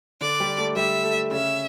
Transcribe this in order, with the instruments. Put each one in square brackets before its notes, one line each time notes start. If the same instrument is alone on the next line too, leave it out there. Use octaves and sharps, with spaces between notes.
[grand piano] D3 D4 [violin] D5
[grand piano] G3 G4
A3 A4
[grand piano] G3 G4 [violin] E5
[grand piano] A3 A4
[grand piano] C#3 C#4 [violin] E5